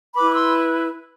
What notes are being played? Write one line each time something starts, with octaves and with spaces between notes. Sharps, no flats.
E4 B4 B5 D6
D6
C6 E6